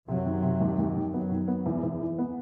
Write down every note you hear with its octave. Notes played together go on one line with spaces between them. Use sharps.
F#2 C3 F#3
D#3
C3
D#2
D#2
D#3
F#2 F#3 B3
D#3
B3
E2
E2
E3
B3